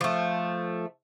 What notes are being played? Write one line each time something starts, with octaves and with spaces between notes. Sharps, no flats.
F3 A3